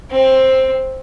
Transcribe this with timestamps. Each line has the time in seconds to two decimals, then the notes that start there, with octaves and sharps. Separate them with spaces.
0.11 C4